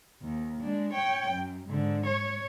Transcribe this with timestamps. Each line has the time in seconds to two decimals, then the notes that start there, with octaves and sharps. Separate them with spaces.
0.22 D#2
0.61 G#3 D4
0.93 C#5 G5
1.30 F#2
1.68 G#2 D3
2.06 C#5